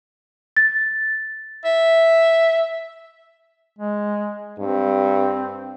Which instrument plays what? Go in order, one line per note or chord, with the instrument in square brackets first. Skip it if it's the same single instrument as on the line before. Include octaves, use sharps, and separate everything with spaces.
[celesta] A6
[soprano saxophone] E5
[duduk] G#3
[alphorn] G2 [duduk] C4